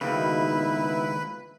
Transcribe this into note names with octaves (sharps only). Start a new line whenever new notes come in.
C#2 B2 D#3 D#4 E4 B4 E5